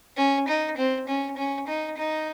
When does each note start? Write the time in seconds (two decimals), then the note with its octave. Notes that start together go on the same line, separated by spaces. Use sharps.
0.17 C#4
0.48 D#4
0.77 C4
1.08 C#4
1.37 C#4
1.68 D#4
1.97 D#4